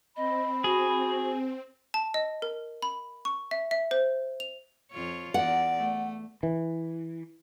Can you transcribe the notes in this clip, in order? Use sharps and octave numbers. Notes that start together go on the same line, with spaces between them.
C4 D#5 B5
F#4 G#4
A5
D#5
A#4
B5
C#6
E5
E5
C5
F7
F2 F4 C#5
E2 D5 F#5
A3
E3